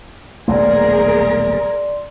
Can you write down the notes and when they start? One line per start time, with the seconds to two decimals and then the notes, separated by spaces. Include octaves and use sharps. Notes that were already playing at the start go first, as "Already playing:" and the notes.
0.48 D#1 B1 A3 G#4 A#4 D5 C6